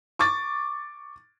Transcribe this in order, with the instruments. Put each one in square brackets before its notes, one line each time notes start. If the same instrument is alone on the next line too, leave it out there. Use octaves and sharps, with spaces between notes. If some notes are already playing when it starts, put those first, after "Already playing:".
[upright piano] C#6 D6 A6